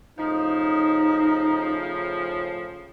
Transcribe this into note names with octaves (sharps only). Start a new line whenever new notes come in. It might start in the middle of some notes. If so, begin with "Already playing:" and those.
A2 C#3 F3 D#4